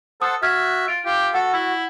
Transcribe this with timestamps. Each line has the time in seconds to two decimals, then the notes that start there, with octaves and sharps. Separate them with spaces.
0.22 A4 C5 F#5 A5 D#6
0.43 F#4 E5 F6 F#6 G#6
0.88 F4 D7
1.06 F4 G4 F5
1.34 F#4 A4 F#5
1.54 E4